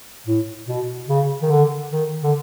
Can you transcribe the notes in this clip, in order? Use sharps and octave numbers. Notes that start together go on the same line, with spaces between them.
A2
B2
C#3
D#3
D3
D#3
D3